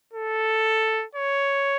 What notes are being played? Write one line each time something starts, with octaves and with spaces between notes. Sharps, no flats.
A4
C#5